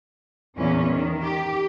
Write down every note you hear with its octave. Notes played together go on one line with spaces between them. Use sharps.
E2 A#2 C#4
D#3
G4